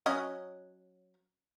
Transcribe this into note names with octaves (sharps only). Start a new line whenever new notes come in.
F#3 C#4 D#5